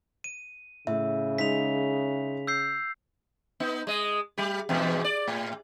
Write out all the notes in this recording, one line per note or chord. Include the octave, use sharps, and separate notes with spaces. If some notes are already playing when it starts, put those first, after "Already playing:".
D#7
A2 C#3 E5
G#3 D#4 B6 F7
E6 G6 C7
B3 D#4
G#3 D#5
G3 G4
E2 G#2 B2
D5
A2